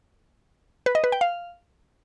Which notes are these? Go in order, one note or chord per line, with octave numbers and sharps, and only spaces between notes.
B4
D#5
B4
G5
F5